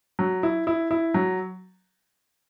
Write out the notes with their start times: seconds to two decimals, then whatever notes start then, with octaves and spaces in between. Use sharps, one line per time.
0.19 F#3
0.43 E4
0.67 E4
0.91 E4
1.14 F#3